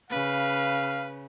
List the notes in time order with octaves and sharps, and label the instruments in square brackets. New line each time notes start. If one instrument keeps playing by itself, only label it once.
[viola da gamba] C#3 [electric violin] B4 [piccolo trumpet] F5